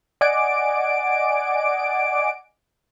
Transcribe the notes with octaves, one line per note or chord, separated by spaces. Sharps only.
D5 D#5 F#5 G#5 D6 D7